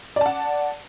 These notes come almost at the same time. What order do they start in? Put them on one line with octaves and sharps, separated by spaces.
D5 A5 F#5